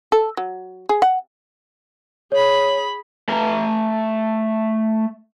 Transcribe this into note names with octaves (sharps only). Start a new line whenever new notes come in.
A4
F#3
G#4
F#5
G#4 C#5 B5
A3 A#5